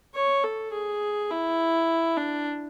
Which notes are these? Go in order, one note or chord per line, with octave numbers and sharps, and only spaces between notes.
C#5
A4
G#4
E4
D4